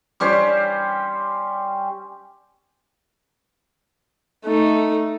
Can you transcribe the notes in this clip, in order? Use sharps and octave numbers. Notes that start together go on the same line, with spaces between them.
G3 C#4 G4 C5
A3 D#4